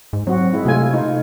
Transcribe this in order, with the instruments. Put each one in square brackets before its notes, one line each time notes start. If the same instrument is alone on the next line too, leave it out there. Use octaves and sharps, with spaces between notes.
[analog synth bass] G#2
[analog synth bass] F#3 [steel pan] C4 F#4
[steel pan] G#3 E4
[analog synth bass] C3 [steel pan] A3 F4 G#5
[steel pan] D#4 F4